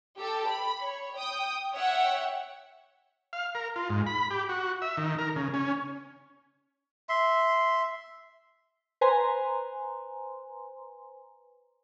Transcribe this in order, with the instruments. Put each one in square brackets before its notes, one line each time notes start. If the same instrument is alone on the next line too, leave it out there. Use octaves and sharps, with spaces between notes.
[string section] G4 A4
B5
C#5
G5 D#6
C#5 E5 F#5 G5
[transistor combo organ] F5
A#4
F4
G#2
B5
G4
F#4
E5
D#3
A#4
C#3
C#4
[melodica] E5 C6
[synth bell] B4 C5 G#5 A#5 C6